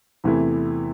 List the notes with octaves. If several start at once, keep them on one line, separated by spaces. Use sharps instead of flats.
E2 C3 E3 A3 E4